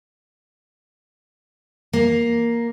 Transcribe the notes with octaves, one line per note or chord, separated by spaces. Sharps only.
A#3